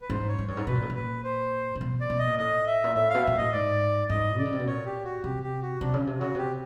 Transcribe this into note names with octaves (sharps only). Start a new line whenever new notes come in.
B4
G#2 C5
C#5
G#2
G2 C#5
G#2
B2 B4
A#2
A2
A#2
B4
C5
A#2
B2
D5
B2
D#5
A#2
A2 D#5
E5
A#2
A2 E5
B2 F5
A#2 E5
A2 D#5
G#2 D5
G#2 D#5
D3 D5
C#3
C3
B2
A#2 C#5
G4
F#4
C3 G4
G4
F#4
C3 D4
C#3
C3
C#3 F#4
C3 G4